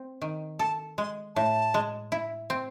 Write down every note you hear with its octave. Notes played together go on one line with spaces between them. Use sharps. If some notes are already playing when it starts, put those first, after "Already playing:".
Already playing: C4
D#3
A4 A5
G#3 C6
A2 A5
G#3
E4
C4